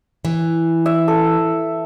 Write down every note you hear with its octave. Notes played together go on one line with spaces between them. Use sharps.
E3
E5
A4